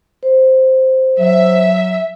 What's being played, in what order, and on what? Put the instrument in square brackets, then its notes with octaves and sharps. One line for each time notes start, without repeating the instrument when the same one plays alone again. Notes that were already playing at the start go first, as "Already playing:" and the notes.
[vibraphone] C5
[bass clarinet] F#3 [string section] E5